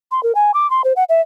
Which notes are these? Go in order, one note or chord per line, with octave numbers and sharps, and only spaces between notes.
C6
A#4
G#5
D6
C6
C5
F#5
E5